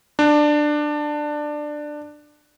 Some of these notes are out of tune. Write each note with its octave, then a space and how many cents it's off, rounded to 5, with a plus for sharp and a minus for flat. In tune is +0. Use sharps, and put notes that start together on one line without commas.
D4 +15